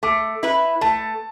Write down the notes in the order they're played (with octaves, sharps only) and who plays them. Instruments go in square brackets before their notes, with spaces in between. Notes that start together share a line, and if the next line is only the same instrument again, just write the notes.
[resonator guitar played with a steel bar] A3 [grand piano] D6
[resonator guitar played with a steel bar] E4 B4
[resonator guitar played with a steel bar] A3 [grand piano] A5